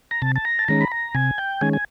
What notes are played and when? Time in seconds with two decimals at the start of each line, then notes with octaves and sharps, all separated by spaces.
0.11 A#5
0.22 C3 A5
0.36 A5
0.45 A#5
0.59 A5
0.68 D#3 G#3 C#4 A#5
0.81 B5
0.92 A#5
1.15 C3 G#5
1.38 G5
1.61 D#3 G#3 C#4 G#5
1.73 G#5